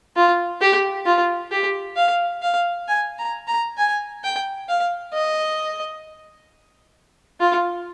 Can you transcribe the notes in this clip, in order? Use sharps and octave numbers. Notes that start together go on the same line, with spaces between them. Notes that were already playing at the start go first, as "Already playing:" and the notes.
F4
G4
F4
G4
F5
F5
G#5
A#5
A#5
G#5
G5
F5
D#5
F4